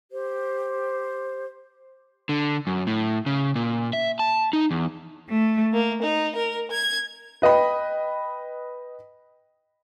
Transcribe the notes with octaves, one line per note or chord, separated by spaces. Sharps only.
G4 C5
D3
F#2
A2
C#3
A#2
E5
A5
D#4
E2
A3
A#3
D#4
A#4
G#6
B4 D#5 G5 B5